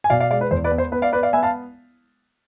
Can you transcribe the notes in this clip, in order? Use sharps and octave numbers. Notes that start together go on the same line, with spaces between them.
G#5
B2 D5 F5
D5 F5
G#3 D5 F5
B4
E2 C5
B4 D5
B3
C5
B3 B4
D5 F5
B3 B4 D5
D5 F5
B3 E5 G#5
F5 A5